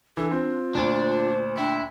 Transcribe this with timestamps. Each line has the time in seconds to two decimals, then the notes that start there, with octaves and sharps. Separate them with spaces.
0.17 E3 D4 A4
0.31 C4 F4
0.75 D2 A#2 D4 C5
1.57 D4 E4 G5